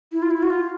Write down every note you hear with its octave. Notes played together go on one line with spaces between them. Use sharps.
E4
F4
E4
F#4
F4